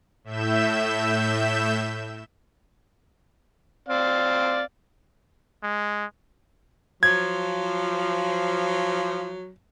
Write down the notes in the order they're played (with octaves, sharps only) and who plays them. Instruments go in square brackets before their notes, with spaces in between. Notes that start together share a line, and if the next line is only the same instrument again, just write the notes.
[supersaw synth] A2 E5 G6 E7
[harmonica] C4 D5 F5
[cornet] G#3
[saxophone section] F3 [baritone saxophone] F#3 [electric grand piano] G#6